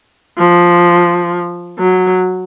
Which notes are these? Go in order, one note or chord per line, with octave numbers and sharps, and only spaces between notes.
F3
F#3